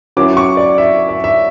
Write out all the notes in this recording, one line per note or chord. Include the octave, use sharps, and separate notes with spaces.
F#3 C#4 E4 D6
C#6
D5
E5
E5
E5